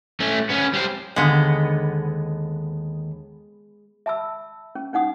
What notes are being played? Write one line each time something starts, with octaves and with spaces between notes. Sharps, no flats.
A3 C#4
B3 C#4
G3 C5
D#2 D3 G#3 B3
E5 A5 B5 E6
C#4
C#4 D#4 F#5 D#6